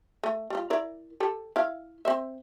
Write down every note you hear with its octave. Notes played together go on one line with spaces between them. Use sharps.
A3
G3 F4
E4 A#4 D5
G4 A4
E4 F5
C4 C5 E5